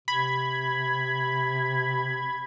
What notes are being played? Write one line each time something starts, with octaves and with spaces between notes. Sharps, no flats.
C3 B5 G#6